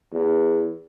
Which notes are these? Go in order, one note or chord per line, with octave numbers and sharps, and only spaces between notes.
E2